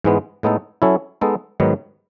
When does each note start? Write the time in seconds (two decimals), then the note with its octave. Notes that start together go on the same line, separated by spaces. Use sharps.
0.04 G#2 E3 G#3 B3
0.43 A2 G#3 B3 D#4 A4
0.82 F#3 C#4 E4 A4
1.21 G#3 B3 D#4 A4
1.60 G#2 D#3 F#3 B3